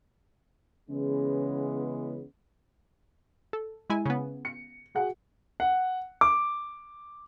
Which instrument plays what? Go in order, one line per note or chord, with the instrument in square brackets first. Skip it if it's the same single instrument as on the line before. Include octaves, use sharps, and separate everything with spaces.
[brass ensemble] C#3 E3 G#3 B3
[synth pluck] A4
G#3 E4 G#5
C#3 B3
[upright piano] C#7
F#4 G#4 F#5
[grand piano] F#5
D6